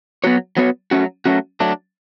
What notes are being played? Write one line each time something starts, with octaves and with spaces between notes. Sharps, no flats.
F#3 B3 F#4 C#5
F#3 B3 F#4 C#5
F#3 A3 C#4 F#4
F#3 A3 C#4 F#4
F#3 A3 D4